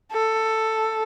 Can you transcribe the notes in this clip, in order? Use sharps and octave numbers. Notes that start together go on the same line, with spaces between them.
A4